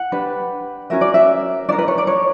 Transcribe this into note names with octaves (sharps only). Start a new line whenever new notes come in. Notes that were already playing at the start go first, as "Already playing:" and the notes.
Already playing: F#5
D4 G4 B4
C#4 F#4 A#4 E5
D5
E5
D4 A#4 D5
B4
C#5
D5
C#5